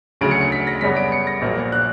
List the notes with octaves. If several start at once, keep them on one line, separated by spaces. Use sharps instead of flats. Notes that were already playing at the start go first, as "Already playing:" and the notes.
D2 C#3 F#3 D7
C#7
C#7
B6
A#6
F#2 C#3 G3 B3 B6
D7
C#7
A#6
A#1 A#2 F#3 A#3
F#6